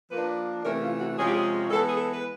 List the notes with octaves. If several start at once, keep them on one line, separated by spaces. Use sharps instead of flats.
F3 A#3 D4 B4
C3 E3 A3 C#4 A#4
F4
F#4
C3 F3 G#3 C#4 G#4
G4
G#4
E3 G#3 B3 A4
G#4
A4
B4